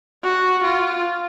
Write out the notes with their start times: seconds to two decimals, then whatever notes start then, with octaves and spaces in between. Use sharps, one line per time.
0.23 F#4
0.64 F4